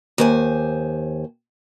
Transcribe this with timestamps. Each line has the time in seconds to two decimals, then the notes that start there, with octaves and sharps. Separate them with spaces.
0.18 D#2 C5 G#5